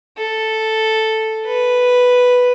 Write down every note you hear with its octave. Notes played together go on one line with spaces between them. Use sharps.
A4
B4